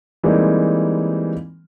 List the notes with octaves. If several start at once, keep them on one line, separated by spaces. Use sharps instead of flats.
E3 G3 G#3 A#3 C4 D#4